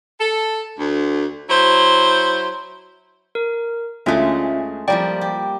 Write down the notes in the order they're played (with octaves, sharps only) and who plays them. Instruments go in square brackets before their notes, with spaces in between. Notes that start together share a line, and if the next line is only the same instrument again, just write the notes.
[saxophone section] A4
D2
F#3 E4 C5
[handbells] A#4
[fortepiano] D2 [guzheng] G#3 A3 [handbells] C#4 F4 E5
[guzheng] F3 G3 A#3 [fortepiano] D5 [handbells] G5
[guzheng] G4